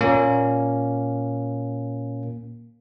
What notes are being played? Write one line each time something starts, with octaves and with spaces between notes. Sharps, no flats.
A#2 A#3 C#4